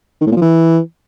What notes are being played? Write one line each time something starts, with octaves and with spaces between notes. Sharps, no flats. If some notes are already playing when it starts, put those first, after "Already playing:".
D#3
A2
A#2
F3
E3